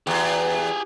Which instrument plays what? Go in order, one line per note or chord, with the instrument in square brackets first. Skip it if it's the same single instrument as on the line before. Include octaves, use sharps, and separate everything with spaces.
[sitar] E2 [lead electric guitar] G4 G#4